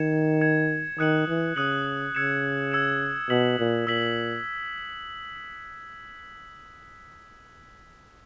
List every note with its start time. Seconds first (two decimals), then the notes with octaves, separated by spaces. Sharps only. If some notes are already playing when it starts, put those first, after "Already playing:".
Already playing: D#3 G#6 C#7 E7
0.41 G#6 C#7 E7
0.98 D#3 D#6 F#6 C#7 F#7
1.28 E3
1.56 C#3 D#6 F#6 C#7 F#7
2.14 C#3 E6 G#6 C#7 E7
2.72 E6 G#6 C#7 E7
3.29 B2 E6 B6 F#7
3.59 A#2
3.87 A#2 E6 B6 F#7